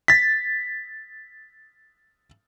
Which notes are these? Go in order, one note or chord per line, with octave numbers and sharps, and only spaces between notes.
A6 B6